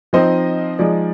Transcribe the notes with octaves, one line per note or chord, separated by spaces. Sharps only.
F3 C4 D#4 C5 D#5
F3 G#3 D#4 D5